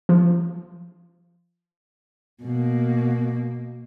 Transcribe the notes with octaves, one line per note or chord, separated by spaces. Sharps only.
F3
B2 A#3